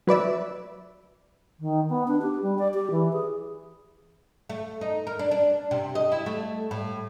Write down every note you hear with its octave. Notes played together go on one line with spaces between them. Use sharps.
F#3 B4 D5 E5
D#3
B3
D4
G4
G3
D5
G4
E3
G#4
A3
D#4
A#4
D4
D4
C3
D#5
E4
A3
A2